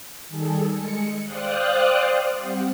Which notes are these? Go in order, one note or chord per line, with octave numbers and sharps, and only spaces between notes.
D#3 G3 G#4 A4
G#3 C#7
C5 D5 F5 G5 D#6 F#6
G3 C4 F#5